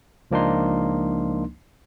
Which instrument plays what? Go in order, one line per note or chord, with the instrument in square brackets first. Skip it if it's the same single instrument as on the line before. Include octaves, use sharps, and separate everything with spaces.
[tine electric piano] C#2 F3 A#3 D4 D#4 C6